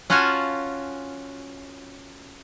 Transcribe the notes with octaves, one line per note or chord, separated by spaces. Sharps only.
C#4 F4 F#4 F#5 G#5 A5